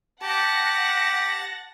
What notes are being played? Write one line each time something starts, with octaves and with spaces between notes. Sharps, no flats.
G4 F#5 A5 A#6